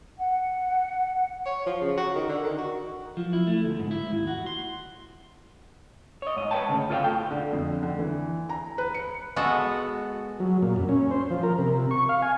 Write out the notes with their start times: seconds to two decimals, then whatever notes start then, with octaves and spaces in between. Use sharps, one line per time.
0.19 F#5
1.46 C#5
1.66 F3
1.81 C#3
1.97 F#4
2.15 D#3
2.29 D3
2.44 D#3
2.58 F#4
3.17 F3
3.33 E4
3.47 A3
3.64 D2
3.79 G#2
3.91 E4
4.12 D#2
4.27 F#4
4.46 C6
6.22 C#5 D#5
6.37 G#2 D#5
6.51 B4 C#5 F#5 G5 A5
6.69 D2 C#3
6.90 F4 A4 B4 D#5 F5 G5
7.04 A2 G5
7.31 D3
7.53 F2
7.83 D3
7.99 E3
8.49 A#5
8.78 B4
8.94 C#7
9.36 G#3 B3 F#4 A4 F#5 A5
10.40 F#3
10.63 A#2
10.76 F#2
10.89 C#4
11.11 C5
11.30 F3
11.43 A#4
11.59 C3
11.91 C#6
12.09 F5
12.22 G#5